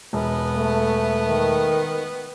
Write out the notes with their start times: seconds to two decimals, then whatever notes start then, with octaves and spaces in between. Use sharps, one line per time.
0.13 E1 B3
0.57 A3
1.25 D#3